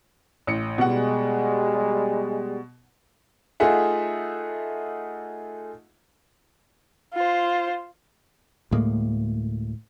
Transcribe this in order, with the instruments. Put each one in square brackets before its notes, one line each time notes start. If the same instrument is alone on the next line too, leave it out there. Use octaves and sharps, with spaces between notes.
[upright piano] A1 C#7
[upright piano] B2 F#5 [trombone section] G3 G#3
[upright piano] A3 D#4 F4 G#4 E5 F#5
[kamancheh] F4 C5
[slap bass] D2 A2 G#3 A#3